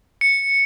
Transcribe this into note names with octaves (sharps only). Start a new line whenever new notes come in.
C#7